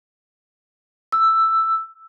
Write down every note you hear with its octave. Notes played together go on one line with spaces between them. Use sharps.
E6